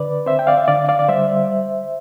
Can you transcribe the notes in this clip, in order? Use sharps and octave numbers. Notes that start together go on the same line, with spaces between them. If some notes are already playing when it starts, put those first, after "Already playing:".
Already playing: D3 B4 D5
C4 C5 E5
G5
D5 F5
E5
D3 D5 F5
D5 F5
D5
G3 C5 E5